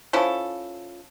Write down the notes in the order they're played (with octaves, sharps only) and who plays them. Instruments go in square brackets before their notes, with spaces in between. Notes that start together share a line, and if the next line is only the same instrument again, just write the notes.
[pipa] F3 C#4 E4 A4